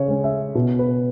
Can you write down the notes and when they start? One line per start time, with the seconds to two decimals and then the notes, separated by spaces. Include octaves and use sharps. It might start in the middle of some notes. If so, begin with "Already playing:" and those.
Already playing: C#3 C#5
0.08 G#3 C#4
0.24 E5
0.55 B2
0.79 B4